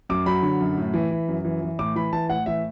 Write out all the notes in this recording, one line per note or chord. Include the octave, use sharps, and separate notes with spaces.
F#2 D6
F#3 B5
D3
F#2
A2
E3
E3
F#2
E3
E3
A2 D6
E3 B5
E3 A5
A2 F#5
E3 E5